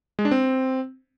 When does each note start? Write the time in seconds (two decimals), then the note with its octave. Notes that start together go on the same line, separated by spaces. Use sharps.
0.19 G#3
0.25 D4
0.31 C4